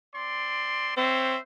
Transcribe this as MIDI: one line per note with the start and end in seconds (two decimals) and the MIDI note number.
0.15 0.94 60
0.15 0.94 74
0.15 0.94 84
0.97 1.36 60
0.97 1.40 72
0.97 1.40 73
0.97 1.40 76